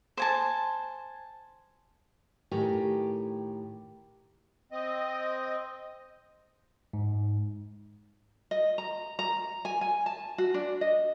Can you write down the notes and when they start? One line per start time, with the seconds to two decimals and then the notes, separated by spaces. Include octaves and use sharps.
0.17 C5 G#5 A5
2.51 A2 D#3 G4 G5 G#5 A#5
4.72 C4 D#5
6.93 G#2
8.51 D#5
8.78 A#5
9.19 A#5
9.65 G#5
9.81 G#5
10.06 A5
10.38 F#4
10.54 D4
10.81 D#5